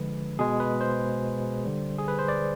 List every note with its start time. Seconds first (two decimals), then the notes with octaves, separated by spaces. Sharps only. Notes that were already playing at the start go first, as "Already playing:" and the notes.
Already playing: D3 F3 G#3 B4
0.39 B2 G#3 G#4
0.60 B4
0.81 C5
1.65 D3 G3
1.99 G#4
2.08 B4
2.19 C5
2.28 D5